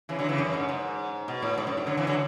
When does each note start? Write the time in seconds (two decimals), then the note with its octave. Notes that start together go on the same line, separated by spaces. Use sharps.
0.09 C#3 E3
0.19 D3 F#3
0.29 C#3 E3
0.38 F#2
0.54 G#2
0.69 G#2
1.28 B2
1.42 A2
1.57 G#2
1.67 F#2
1.77 G#2
1.87 D3 F#3
1.97 C#3 E3
2.07 D3 F#3